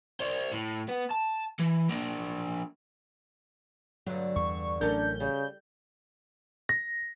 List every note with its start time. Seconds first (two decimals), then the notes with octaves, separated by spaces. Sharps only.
0.20 C5 D5
0.52 A2
0.89 B3
1.11 A5
1.60 E3
1.90 A#3 D4
4.07 G2 D3 F#3
4.36 E2 G3 C#6
4.81 A1 A2 F#3 C#4 D4 A4 A#4 G6
5.20 C#3 G3
6.69 A#6